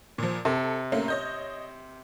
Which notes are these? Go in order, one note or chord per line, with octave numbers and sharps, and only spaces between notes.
A#2 F3
C3 A4
A3 A#3 C#4
C#5 D#5 G6